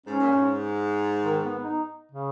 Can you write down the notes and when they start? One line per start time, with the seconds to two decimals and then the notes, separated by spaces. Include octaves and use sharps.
0.06 G#2 C#4
0.19 A#2
0.31 G#2
1.23 D#3
1.43 B3
1.63 D#4
2.12 C#3